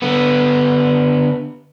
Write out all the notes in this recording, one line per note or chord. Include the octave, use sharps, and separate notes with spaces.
D3 B3